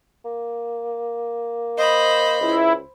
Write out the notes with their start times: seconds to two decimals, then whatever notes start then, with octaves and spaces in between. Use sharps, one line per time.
0.25 A#3
1.78 C5 D#5 B5
2.41 C#2 E4